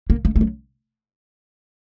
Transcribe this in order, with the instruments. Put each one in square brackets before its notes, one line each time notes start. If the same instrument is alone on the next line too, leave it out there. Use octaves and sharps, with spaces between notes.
[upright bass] A#3
A3
A3
F#3